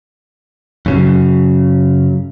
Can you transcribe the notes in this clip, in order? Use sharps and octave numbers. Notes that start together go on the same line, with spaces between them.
F#2 C#3 F#3